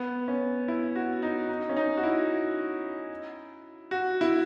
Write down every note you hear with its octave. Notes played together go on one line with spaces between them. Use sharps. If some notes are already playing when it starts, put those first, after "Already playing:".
Already playing: B3
C#4
E4
F#4
D#4
D#4
C#4
D#4
F#4
E4
F#4
E4